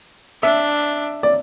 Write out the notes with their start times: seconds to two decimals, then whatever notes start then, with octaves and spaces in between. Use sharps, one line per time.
0.42 D4 E5
1.23 D5